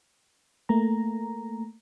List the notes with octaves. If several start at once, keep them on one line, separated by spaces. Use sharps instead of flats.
A3 A#3 A#5